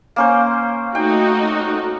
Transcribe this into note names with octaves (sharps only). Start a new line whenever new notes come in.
A#3 C#4 C5
A3 D#4 F#4 G5